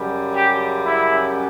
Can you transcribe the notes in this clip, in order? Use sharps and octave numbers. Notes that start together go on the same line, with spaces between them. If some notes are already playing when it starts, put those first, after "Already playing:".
Already playing: F#2 C#3 G3
G4
E4